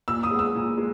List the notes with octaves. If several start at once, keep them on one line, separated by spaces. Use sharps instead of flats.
A#2 E6
D#6
G#3 B3
E6
A#2
G#3